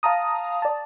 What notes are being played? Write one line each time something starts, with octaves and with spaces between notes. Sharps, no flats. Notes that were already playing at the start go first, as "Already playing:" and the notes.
F5 A5 A#5 D#6
D5 A5